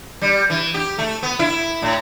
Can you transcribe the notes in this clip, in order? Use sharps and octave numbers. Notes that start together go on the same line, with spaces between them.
G3
E3
G4
A3
B3
E4
A2